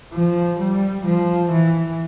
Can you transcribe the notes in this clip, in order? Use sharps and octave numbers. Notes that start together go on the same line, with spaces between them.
F3
G3
F3
E3